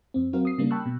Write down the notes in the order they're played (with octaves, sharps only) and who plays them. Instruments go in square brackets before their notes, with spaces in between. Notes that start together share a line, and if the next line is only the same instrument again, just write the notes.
[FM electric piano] F2 C4
F#3 C4 F#4 A#4 F5
D#6 C7
C#3 G3 A#3 D4
G5 A5 B5 C#6 E6 F#6
B2